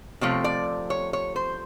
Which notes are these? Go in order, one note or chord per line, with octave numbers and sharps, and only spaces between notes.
C3 F3 A3 C4 C#5
D5
C#5
C#5
C5